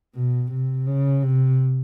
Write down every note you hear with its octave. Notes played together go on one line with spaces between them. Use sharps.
B2
C3
C#3
C3